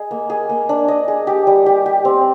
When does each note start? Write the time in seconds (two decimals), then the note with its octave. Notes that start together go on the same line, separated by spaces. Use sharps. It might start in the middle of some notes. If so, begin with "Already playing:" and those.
Already playing: G#4 D#5
0.11 A#3
0.30 G#4
0.49 A#3
0.69 D4
0.88 D#5
1.08 G#4
1.27 G4
1.47 G3
1.66 G4
1.86 G4
2.05 C4